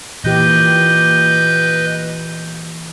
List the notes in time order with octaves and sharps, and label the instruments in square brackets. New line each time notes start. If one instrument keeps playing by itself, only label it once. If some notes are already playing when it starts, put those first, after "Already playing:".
[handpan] A#2 E3 G4 [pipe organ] B4 D#5 G6